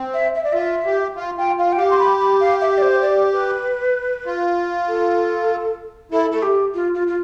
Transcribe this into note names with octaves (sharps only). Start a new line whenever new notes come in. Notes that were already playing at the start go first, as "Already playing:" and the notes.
Already playing: C4
E5
E5
D5
F4 E5
G4
F4 F5
F4 G5
F4 F5
G5
G4 F5
C6
B5
B5
F5
E5
D5
C5
D5
B4
F4
A4
E4 A4
A3 A4
G4
F4
F4
F4